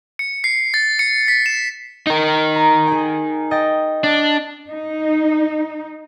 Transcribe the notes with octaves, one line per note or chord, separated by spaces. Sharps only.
C#7
C7
A6
C#7
B6
E7
D#4 A#4
A#5
G#4 G#5
D#5 G5 A6
D4
D#4